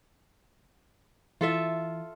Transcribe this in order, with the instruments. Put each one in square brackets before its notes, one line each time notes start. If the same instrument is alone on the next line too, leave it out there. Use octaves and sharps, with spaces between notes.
[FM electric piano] E3 [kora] F4 A4 E5